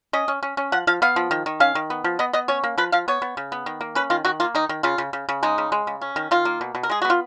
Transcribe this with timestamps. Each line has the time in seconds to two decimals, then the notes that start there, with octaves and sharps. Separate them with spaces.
0.13 C#4 D#5
0.28 C#4
0.43 C#4
0.57 C#4
0.72 F3 F#5
0.87 F3 F5
1.02 B3 F5
1.16 F3
1.31 D#3
1.46 D#3
1.60 C#4 F5
1.75 D#3
1.90 B3
2.04 F3
2.19 B3 D#5
2.33 B3 D#5
2.48 C#4 C#5
2.64 A#3
2.78 F3 B4
2.92 F3 F5
3.08 B3 C#5
3.22 B3
3.37 C#3
3.52 B3
3.66 D#3
3.81 A#3
3.95 C#4 B4
4.10 D#3 F4
4.25 D#3 F#4
4.40 A#3 F4
4.55 D#3 D#4
4.69 D#3
4.83 C#3 F4
4.98 C#3
5.13 C#3
5.29 C#3
5.43 G#3 D#4
5.58 C#3
5.72 G#3
5.87 C#3
6.01 C#4
6.16 D#3
6.31 D#3 F4
6.45 A#3
6.61 B2
6.75 B2
6.83 A#4
6.90 G#3 G#4
7.02 B3 F#4
7.10 F4